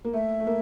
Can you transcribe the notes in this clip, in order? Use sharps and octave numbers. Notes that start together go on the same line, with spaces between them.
A#3
A3 E5
A3
A#3